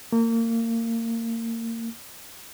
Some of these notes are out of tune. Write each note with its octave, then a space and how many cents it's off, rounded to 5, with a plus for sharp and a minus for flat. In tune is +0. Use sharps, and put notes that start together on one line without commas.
A#3 -30